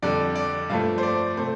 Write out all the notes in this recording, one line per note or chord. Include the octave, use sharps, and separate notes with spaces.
F2 D3 G3 D5
D5
G2 F3 A3 F5
C5
D5
C3 A3 C5